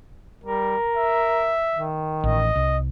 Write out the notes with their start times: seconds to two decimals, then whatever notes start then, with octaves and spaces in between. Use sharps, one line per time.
0.44 G3 A#4
0.97 E5
1.73 D#3
2.24 A1 D#5
2.56 C2